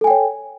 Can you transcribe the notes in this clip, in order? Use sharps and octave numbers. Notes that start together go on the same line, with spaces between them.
A4 C#5 G5 G#5